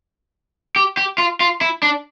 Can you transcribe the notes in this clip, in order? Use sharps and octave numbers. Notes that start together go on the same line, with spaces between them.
G4
G4
F4
F4
E4
D4